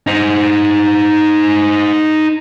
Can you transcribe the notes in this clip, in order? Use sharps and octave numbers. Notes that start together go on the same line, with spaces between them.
D#4 C5